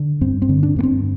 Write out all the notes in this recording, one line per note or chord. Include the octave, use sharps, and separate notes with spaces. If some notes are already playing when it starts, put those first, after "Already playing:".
Already playing: D3
G2 C4
C4
D3
D4
G2 A#3
C4